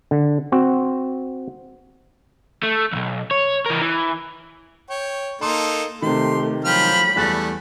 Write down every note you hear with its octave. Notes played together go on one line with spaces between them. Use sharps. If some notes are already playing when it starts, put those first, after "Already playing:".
D3
C4 F#4
A3
B1 E2
C#5
E3 A#4
E3
C#5 G5
A#3 D#4 A4 C6
C3 D#3 A3 G4 C6
F3 F#3 G5 B5 F6
E2 G3 A3 A4 F#6 A6